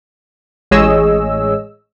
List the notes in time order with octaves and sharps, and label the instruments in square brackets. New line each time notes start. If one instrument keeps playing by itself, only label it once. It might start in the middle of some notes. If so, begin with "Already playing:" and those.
[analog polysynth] A1 G#3 G#4 C#5 D#5 E6